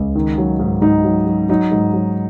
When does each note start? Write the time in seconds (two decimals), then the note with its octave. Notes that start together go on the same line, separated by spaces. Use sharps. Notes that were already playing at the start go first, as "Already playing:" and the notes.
Already playing: C#2
0.15 D#3
0.38 F#3
0.60 G#2
0.82 G#2 D#4
1.04 F#3
1.27 F#3
1.49 F#3 D#4
1.72 G#2
1.94 F#3